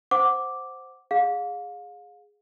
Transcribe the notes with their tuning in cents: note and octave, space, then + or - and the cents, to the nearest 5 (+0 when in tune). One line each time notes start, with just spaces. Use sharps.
C5 +0 F#5 +0 D6 +0
G#4 +0 F5 +35